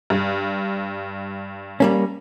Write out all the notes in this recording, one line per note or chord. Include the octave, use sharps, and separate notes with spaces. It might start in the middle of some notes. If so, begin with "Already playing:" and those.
G2
G3 A#3 C#4